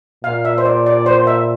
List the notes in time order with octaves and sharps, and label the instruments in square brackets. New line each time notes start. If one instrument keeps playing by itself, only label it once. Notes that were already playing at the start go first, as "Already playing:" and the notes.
[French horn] A#2 [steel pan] F5
[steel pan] E5
C5
D5
D5
C5
E5